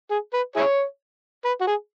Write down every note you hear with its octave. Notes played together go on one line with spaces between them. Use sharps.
G#4
B4
E4 G#4 C#5
B4
F#4
G#4